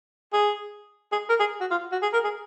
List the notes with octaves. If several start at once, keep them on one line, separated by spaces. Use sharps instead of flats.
G#4
G#4
A#4
G#4
F#4
F4
F#4
G#4
A#4
G#4